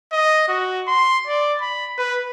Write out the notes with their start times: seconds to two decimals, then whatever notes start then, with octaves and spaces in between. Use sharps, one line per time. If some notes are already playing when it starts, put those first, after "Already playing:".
0.12 D#5
0.48 F#4
0.87 C6
1.27 D5
1.61 B5
1.98 B4